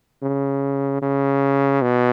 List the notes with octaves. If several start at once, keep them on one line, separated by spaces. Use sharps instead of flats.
C#3
C#3
B2